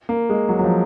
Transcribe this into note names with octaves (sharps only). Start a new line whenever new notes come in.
A#3
G#3
F#3
F#3
F3